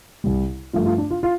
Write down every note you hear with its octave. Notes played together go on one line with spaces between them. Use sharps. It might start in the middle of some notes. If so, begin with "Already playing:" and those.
C2 C3 G3
G2 F3 A3 F4
F4
D4
F4
F4